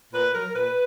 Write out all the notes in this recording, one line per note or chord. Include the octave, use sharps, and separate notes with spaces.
A#2 B4
F#3 A#4
A#2 B4